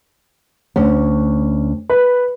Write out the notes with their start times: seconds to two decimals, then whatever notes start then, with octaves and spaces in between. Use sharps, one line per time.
0.76 D2 C#4
1.90 B4